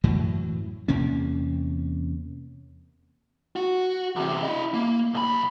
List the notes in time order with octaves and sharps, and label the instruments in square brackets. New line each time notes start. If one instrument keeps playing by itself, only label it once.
[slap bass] F#2 A2 E3 F#3
E2 C3 A#3 C#4
[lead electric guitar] F#4
E2 C3
E4 D#5
A#3
B1 B5